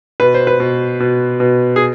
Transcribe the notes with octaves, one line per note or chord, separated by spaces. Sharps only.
B2 B4
C5
B4
B2
B2
B2
G#4